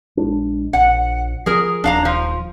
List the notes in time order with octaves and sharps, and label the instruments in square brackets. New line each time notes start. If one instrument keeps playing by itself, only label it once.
[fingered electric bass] A#1 G#3 D4
[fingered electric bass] A#1 [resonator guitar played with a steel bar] F#5
[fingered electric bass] F3 [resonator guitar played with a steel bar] G#4 A#4
[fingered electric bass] D#1 [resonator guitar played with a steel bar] D4 F5 A#5
[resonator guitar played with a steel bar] F3